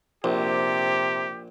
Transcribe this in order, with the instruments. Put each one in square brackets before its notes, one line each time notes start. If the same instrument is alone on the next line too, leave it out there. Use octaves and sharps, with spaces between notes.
[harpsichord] A#1 [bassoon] C3 [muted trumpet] G4